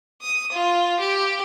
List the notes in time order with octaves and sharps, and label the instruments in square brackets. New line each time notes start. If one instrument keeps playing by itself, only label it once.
[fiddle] D#6
F4
G4